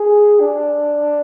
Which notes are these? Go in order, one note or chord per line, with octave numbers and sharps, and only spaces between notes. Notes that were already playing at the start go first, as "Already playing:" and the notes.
Already playing: G#4
D4